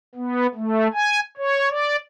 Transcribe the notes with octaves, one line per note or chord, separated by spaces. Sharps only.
B3
A3
G#5
C#5
D5